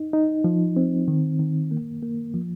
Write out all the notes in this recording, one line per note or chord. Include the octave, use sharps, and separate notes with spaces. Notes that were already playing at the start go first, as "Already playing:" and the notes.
Already playing: D#4
D#4
F3
C4
D#3
D#3
A#3
A#3
F3